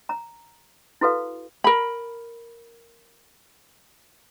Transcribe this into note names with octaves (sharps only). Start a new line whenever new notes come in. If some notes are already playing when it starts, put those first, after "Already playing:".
A#5
E4 F#4 A4 B4 F5
A#4 B5